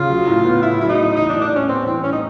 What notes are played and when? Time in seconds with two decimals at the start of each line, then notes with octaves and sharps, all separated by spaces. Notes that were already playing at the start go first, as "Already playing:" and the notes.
Already playing: C#3 F4
0.10 F#3
0.27 A2
0.45 B3
0.62 A2 E4
0.81 F#3 E4
0.89 D#4
0.98 A2
1.16 E3 D#4
1.29 D4
1.34 A2
1.42 D4
1.51 G3 C#4
1.68 B3 C4
1.86 E3 C4
2.03 A2 C#4
2.12 D#4